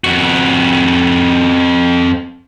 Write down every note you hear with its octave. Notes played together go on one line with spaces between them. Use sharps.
F2 F#4